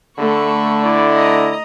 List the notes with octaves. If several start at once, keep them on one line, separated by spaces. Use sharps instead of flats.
D3 A3 B5 C#6
E4 D5
D#5 A#5